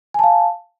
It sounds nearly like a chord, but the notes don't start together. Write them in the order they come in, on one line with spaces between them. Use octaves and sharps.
G#5 A5 F5